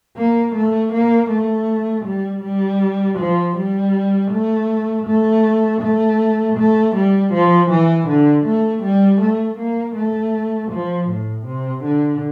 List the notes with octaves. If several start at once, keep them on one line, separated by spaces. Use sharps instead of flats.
A#3
A3
A#3
A3
G3
G3
F3
G3
A3
A3
A3
A3
G3
F3
E3
D3
A3
G3
A3
A#3
A3
F3
A2
C3
D3